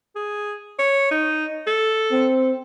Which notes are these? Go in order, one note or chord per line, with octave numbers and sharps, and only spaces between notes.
G#4
C#5
D#4
A4
C4